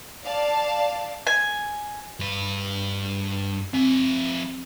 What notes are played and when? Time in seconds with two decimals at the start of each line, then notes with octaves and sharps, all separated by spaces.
0.24 D5 F5 A5
1.27 G#5
2.20 G2 B4
3.73 F3 C4 E5